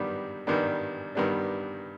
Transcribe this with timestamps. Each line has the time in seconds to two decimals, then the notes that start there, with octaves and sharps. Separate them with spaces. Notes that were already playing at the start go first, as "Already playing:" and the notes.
Already playing: G2 D#3 G3 B3 D4
0.47 G2 D#3 G3 B3 D4
1.15 G2 D#3 G3 B3 D4